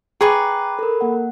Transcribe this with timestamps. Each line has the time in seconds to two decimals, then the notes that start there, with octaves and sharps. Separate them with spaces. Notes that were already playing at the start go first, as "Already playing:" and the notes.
0.21 G#4 B4 G5 A#5 C#6 D6
0.79 A4 A#4
1.01 A#3 F#5